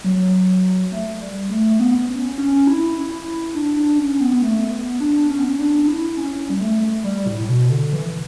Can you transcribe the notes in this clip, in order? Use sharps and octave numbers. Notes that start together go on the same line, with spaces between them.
F#3
A3
G3
A3
B3
C#4
C#4
E4
E4
D4
D4
C#4
B3
B3
A3
B3
D4
C#4
B3
C#4
D4
D4
E4
C#4
G3
A3
G3
A2
A2
B2
D3
E3